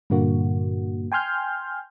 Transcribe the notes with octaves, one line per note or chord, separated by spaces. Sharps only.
G2 A#2 D3 A#3 F#4
G5 G#5 C6 F6 G6